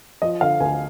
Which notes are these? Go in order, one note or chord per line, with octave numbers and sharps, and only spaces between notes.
F3 D#5
D3 F5
D2 G#5